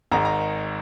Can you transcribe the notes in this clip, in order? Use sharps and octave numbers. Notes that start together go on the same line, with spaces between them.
G#1 G#2 D#3 A#5
A#5